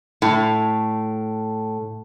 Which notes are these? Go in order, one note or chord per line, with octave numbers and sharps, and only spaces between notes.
A2